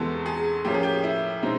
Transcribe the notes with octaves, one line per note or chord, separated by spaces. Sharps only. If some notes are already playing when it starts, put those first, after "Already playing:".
Already playing: E2 C3 E3 G#3 B3 A4
G#4
A2 F3 A#3 C#4 G4
G#4
G4
E4
B2 G#3 C4 D#4